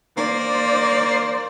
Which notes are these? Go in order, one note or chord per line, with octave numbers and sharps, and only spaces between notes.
A#3 C5 D5